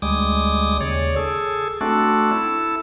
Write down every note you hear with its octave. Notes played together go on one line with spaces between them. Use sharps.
D2 G3 G#3 D6 D#6
D#2 C#3 C#5 D5
G#4 A4
A3 C4 D4 F#4 A4
E4 A4